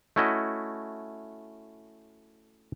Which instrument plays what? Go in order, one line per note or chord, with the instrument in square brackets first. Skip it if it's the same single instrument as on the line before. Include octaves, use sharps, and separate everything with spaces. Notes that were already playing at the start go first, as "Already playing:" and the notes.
[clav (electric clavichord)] A3 C#4 E4 F#4 D#5